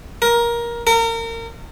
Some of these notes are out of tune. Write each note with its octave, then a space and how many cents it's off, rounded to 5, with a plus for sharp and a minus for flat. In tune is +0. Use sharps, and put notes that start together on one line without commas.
A#4 +15
A#4 -30